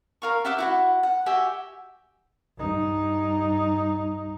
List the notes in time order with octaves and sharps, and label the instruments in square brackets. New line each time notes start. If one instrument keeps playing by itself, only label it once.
[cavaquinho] A#4 F5 C#6
G4 E5 F#5 D6
E4 F#4 F#5
F#5
F#4 G4 E5 G#5
[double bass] G2 D#4